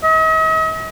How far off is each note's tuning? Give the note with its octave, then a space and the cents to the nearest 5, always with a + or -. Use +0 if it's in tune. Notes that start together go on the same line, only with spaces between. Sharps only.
D#5 +45